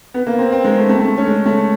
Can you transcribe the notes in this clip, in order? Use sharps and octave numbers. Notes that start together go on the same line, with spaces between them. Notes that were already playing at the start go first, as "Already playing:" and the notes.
B3
A#3
C4
C4
G#3
A3
A3
A3
C#4
G#3
A3